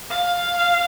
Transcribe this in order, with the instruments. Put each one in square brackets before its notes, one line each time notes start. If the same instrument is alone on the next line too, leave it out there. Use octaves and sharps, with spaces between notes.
[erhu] F5